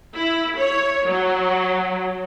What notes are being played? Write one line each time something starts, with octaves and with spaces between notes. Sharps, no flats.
E4
C#5
F#3